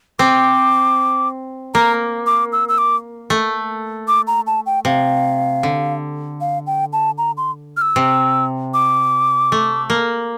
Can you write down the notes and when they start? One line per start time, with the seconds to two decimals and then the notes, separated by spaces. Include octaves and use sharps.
0.19 C4 D6
1.74 A#3 A#5
2.26 D6
2.52 E6
2.69 E6
2.78 D6
3.30 A3
4.08 D6
4.27 A#5
4.47 A5
4.66 G5
4.85 C3 F5
5.63 D3
6.41 F5
6.67 G5
6.93 A5
7.18 A#5
7.37 C6
7.77 F6
7.82 E6
7.96 C3
8.74 D6
9.52 A3
9.90 A#3